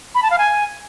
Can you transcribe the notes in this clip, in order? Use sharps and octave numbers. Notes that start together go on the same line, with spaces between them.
B5
A5
F5
G#5